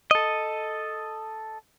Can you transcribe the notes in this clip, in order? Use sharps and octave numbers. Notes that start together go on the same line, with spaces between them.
A4 D#5